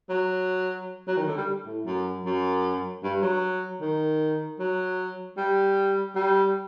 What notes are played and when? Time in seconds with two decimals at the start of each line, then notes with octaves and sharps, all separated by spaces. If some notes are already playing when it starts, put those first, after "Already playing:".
0.10 F#3
1.08 F#3
1.17 D#3
1.27 D3
1.37 G3
1.66 A2
1.86 F#2
2.25 F#2
3.03 G2
3.22 F#3
3.81 D#3
4.59 F#3
5.37 G3
6.15 G3